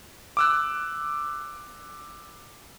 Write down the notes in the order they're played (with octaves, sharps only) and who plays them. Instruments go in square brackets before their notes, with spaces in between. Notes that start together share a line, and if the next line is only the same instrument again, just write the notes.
[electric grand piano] D6 E6 F#6